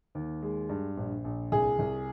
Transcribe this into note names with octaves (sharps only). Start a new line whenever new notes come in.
D#2
G#3
G2
A#1
A#1
C2 G#4
C2